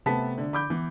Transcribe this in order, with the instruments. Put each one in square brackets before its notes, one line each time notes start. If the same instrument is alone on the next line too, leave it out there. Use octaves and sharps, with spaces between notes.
[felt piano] C3 A3 [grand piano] B3 A5 B6
[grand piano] D3
[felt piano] B5 D6 G6
[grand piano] E3 [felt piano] B3